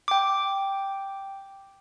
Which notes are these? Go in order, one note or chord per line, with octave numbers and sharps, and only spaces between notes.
G5 D6